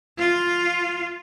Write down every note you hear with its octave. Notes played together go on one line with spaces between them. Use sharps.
F4